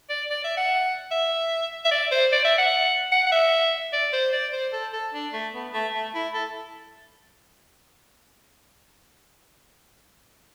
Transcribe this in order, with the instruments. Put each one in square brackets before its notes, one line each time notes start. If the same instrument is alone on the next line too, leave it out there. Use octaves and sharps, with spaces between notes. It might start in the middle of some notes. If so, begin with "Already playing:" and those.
[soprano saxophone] D5
D5
E5
F#5
E5
E5
D5
C5
D5
E5
F#5
F#5
F#5
E5
D5
C5
D5
C5
A4
A4
D4
A3
B3
A3
A3
E4
A4